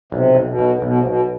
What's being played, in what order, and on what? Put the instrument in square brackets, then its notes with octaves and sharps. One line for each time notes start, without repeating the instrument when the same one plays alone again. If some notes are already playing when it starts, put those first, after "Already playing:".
[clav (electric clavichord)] B1 [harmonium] C3
[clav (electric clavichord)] B1
[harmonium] B2
[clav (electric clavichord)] B1
[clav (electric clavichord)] B1 [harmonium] B2
[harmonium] C3
[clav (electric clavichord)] B1 [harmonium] B2